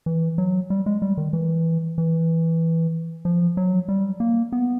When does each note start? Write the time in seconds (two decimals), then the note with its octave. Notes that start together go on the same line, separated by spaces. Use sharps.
0.06 E3
0.38 F#3
0.70 G3
0.86 G#3
1.02 G3
1.17 D#3
1.33 E3
1.98 E3
3.25 F3
3.57 F#3
3.89 G3
4.20 A#3
4.52 B3